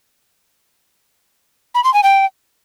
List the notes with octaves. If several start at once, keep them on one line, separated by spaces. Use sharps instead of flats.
B5
C6
G#5
G5